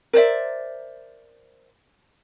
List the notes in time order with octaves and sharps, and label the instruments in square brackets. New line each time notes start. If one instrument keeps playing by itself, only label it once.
[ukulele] A#4 C5 D5 E5